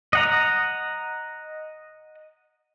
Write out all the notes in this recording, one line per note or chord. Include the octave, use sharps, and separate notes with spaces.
D#5 F#5 A#5